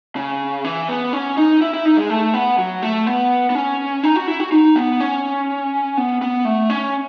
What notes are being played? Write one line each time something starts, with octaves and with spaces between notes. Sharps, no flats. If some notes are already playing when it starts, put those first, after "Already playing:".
C#3
E3
B3
C#4
D#4
E4
E4
D#4
G#3
A3
B3
F#3
A3
B3
B3
C#4
D#4
F#4
E4
F#4
D#4
B3
C#4
B3
B3
A3
C#4